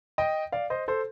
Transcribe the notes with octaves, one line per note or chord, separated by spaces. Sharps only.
D#5 G5
D5 F5
C5 D#5
A4 C5